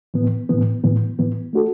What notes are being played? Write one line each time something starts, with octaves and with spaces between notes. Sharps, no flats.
A2 E3 B3
A2 E3 B3
A2 E3 B3
A2 E3 B3
A3 D4 F#4 A4